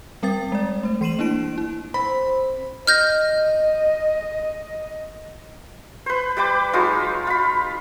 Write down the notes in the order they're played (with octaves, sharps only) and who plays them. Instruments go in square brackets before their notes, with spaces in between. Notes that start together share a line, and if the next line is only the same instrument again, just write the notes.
[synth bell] G3 C4 A#4 G5 D#6 A6
G#3 D5
A3 C5
E3 C6 C7 D#7 E7 F#7
A#3 D4 E4 D7
E4
[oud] C4 [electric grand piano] B5
[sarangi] D#5 [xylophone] F6 G6 A#6
[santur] B4 C5
G3 B4 G5 D6
F#3 G#3 D#4 F4
F4 B5